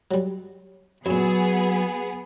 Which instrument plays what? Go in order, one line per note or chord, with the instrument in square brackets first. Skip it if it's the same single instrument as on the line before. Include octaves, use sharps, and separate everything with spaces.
[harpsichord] F#3 G3
[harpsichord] F#2 A#2 [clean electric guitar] F#3 [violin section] B3 G#4